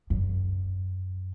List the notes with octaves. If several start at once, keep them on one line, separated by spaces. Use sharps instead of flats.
F#2